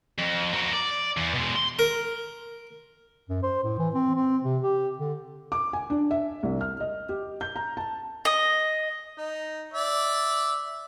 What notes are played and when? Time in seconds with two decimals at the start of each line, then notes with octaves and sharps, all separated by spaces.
0.19 F2
0.54 A#3 F#4
0.73 D5
1.17 E2
1.34 B2 G#3
1.56 C6
1.79 A#4
3.29 F#2
3.43 C5
3.63 A2
3.78 E3
3.94 C4
4.15 C4
4.44 C3
4.62 G4
4.98 D3
5.52 D6
5.73 G#5
5.90 D4
6.11 E5
6.43 C2
6.61 F6
6.80 D#5
7.09 G4
7.41 G6
7.56 A#5
7.77 A5
8.25 D#5
9.18 D#4
9.74 D5 E5